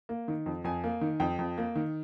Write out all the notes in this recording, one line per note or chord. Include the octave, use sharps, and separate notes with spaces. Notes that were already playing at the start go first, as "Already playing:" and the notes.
A#3
D#3
F2
F2 G#5
A#3
D#3
F2 G5
F2
A#3
D#3